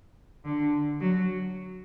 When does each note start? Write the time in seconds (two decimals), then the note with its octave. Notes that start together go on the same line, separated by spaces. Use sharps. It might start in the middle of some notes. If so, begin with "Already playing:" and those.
0.45 D3
1.00 F#3